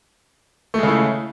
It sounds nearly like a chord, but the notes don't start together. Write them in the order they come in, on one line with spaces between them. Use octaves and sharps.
A3 G#3 C#3 E4